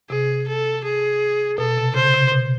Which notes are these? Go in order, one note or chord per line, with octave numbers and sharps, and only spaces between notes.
C3 G#4
A4
G#4
B2 A4
C3
C#3 C5
C3
B2